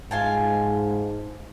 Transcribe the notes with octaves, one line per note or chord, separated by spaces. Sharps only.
G#2 F4 G#5 A5